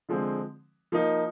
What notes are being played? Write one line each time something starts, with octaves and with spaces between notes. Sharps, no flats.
D3 F3 G#3 C4
F3 A#3 D#4